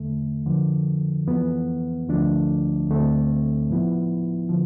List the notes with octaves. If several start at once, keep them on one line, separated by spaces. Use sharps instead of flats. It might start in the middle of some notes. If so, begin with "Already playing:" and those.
Already playing: E2 D3 A3
F2 D3 F3
F2 E3 B3
D2 D3 F3 A3 D4
D2 D3 A3 C4
A2 F3 B3 E4
D3 F3